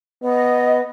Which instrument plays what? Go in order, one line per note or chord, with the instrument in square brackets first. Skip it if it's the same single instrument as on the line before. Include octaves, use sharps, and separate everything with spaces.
[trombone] B3 [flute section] D#5